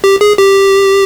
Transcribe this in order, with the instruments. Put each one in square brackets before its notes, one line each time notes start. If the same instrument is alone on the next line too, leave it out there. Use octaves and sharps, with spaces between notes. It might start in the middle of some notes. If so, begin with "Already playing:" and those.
[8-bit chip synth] G4
G#4
G4